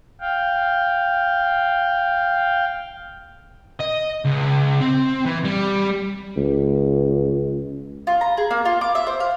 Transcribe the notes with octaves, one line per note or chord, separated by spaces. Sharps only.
F5 G5
D#5
C#2
C4
E3
G3
C#2
F4
A#5
G#4
A#3
F4
D6
E5
C5
F5